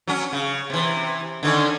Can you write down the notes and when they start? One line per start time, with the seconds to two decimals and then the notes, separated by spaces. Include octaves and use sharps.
0.08 F#3 C#4
0.33 C#3
0.70 C3 E3
1.43 D3 D#3 C#4